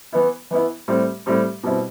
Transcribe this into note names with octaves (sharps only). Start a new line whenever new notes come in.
E3 B3 E4
E3 B3 E4
A2 G3 C4
A2 G3 C4
B2 G3 C4 E4